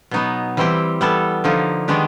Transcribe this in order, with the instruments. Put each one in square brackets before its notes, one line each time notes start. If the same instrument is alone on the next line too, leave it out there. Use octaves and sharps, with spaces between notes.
[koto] B2 F#3 B3 D#4
E3 G3 C4 E4 G4
G3 B3 E4 A4
D3 F3 A#3 D#4
D#3 G#3 B3 D4 G4